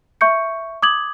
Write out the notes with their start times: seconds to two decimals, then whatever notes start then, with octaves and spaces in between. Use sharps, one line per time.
0.21 E5 C#6 G6 C#7
0.82 D6 D#6 G#6 F#7